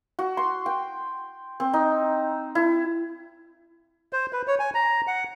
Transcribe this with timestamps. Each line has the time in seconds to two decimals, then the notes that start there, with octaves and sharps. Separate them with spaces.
0.19 F#4
0.37 C6
0.66 G5
1.60 C4
1.73 D#4
2.55 E4
4.13 C5
4.33 B4
4.48 C#5
4.59 G#5
4.75 A#5
5.07 F#5